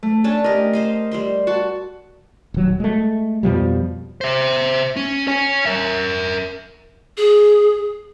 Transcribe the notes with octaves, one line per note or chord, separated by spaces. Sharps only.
A3
C#4 D4 A5
G4 A#4 D#5
C5 D#5 F5
G3 C5 C6
F#4 A5
D#1 F#3
G#3 A3
F2 B2 F3 G3
C5 E5
C#4
C#5 G#5
A#4 E5
G#4